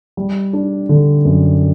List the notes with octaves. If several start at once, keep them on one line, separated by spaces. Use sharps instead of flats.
G3
D4
D3
F#2